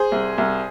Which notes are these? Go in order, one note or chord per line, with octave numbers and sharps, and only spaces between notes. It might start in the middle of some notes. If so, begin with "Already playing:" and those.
Already playing: G#4 C5
C2
C2